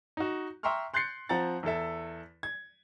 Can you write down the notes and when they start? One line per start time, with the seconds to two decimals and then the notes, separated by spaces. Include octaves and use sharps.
0.17 D#4 F#4
0.63 E5 G5 A#5 C6 C#6 F6
0.94 C6 F#6 G6 A6 C7 C#7
1.29 F3 C4 F#5 A#5 A6
1.63 E2 E4 A4 E5
2.43 G#6